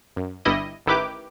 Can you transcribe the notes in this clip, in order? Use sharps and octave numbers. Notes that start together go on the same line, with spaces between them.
F#2
G1 G2 G3 E4 D#5 D#6
A1 D#3 E4 G4 B4 D6